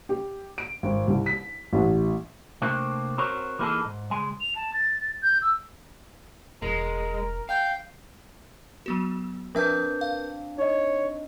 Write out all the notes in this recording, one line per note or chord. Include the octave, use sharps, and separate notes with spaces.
G4
D7
G#1
C2
B6
A1
C3 A3 A#3 C4 D4 F4
C4 F#4 A#4 C5 C#5
E3 A#3 D#4 E4 G#4 A4
G#2
C#2 G#3 G#5
F7
A5
A6
G6
E6
E1 G#3 A#4
F5 G5
F#3 B3 F#4
F3 C4 D4 A#4 B4 E5 G#5 G6
F5
D#4 C#5 D#5